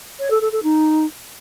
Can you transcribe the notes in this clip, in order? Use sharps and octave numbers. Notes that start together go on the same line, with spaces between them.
C#5
A4
A4
A4
D#4